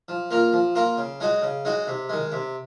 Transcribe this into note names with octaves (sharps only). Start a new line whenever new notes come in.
F3
A#3 F4 A#4
F3
A#3 F4 A#4
C#3
G#3 D#4 F#4
C#3
G#3 D#4 F#4
C3
D#3 G#3
C3